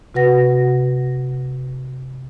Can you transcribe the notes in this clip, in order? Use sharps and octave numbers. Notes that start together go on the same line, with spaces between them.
C3 F#4 B4 F#5 A#6